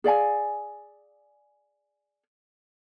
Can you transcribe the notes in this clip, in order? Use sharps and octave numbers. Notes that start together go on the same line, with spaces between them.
G#4 D5 F5 G#5